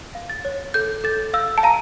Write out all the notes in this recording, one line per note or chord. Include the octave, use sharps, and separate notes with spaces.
F5
A6
C#5
A4 G6
A4 A6
F5 E6
A5
F5 A#5